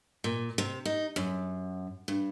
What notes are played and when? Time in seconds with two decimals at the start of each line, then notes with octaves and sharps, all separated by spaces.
0.24 A#2
0.58 C3
0.85 D#4
1.16 F#2
2.08 G2